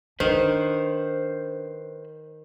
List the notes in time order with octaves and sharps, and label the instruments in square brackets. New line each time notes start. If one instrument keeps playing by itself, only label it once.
[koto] D#3 [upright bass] D4 [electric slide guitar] B4 C5